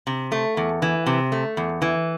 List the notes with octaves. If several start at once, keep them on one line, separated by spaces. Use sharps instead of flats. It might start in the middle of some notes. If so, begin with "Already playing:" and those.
C3
A3
E2
E3
C3
A3
E2
E3